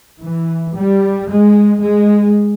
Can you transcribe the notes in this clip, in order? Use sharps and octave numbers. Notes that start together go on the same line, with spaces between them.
E3
G3
G#3
G#3